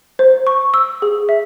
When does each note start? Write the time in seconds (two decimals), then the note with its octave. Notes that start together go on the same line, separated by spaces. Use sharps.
0.19 C5
0.47 C#6
0.74 E6
1.02 G#4
1.29 E5